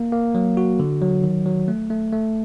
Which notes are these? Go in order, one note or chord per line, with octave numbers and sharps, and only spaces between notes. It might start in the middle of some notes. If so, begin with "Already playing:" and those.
Already playing: A#3
A#3
F#3
F#4
D3
F#3
D#3
F#3
A3
A3
A3